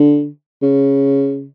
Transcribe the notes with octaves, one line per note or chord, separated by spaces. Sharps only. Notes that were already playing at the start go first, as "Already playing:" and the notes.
Already playing: D3
C#3